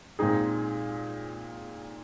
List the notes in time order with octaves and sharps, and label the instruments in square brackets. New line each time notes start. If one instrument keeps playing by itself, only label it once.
[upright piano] A#2 G#3 C4 D#4 G#4